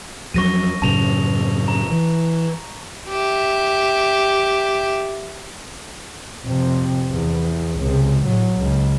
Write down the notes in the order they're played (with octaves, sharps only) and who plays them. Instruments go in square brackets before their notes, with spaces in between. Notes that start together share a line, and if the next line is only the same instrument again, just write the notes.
[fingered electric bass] F2 F#3 [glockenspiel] C#6 A#6 D#7
[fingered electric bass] F#2 A2 C#3 [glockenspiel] A5 F7
[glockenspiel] A#5
[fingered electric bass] E3
[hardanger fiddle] G4 E5
[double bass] F2 C3
E2
C#2 C3
A2 F#3
C#2